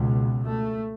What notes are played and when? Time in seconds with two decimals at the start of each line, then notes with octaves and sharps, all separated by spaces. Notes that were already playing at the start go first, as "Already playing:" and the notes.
Already playing: C#2 B2
0.45 A3